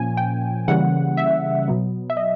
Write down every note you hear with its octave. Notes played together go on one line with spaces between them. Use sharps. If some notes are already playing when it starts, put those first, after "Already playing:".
Already playing: A#2 F3 A#3 C#4 G#5
G5
C#3 E3 G3 A#3 C#4 F#5
E5
B2 F#3 B3
E5
D#5